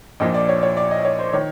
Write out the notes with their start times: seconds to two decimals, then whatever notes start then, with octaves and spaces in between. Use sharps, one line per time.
0.20 A#1 A#2 F3 D#5
0.34 D5
0.49 C#5
0.63 C#5
0.77 D5
0.91 D#5
1.05 C#5
1.19 C5
1.33 D#3 C#5